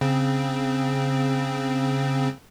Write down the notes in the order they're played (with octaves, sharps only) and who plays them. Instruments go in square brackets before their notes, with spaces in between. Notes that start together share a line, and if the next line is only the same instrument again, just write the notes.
[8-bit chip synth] C#3 C4